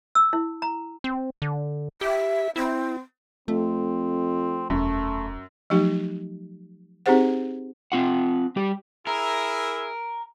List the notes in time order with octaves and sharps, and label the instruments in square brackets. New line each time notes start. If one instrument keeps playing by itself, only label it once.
[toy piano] E6
E4
A#5
[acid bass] C4
D3
[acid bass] G4 [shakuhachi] E5
[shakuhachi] C4 [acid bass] E4
[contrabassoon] F2 [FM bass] A3 [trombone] C4
[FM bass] E1 [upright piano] F#2 [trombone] A3
[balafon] F3 F#3 A3 D#4 G4
C4 D#4 G4 G#4 C5 F#5
[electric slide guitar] C4 F4 F#5
G3 G4
[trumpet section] E4 G#4 E5 [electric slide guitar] A#4